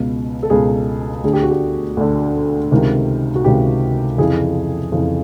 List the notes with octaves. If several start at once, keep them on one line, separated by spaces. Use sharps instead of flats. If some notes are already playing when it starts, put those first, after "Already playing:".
Already playing: C#2 B2
A4
C#2 B2 G#4
D2 D3 G#4
G4
F#4
G4
D2 D3
C#2 C3 D#3
F#4
C#2 C3 D#3 G4
F2 C#3 E3 G#4
F2 C#3 E3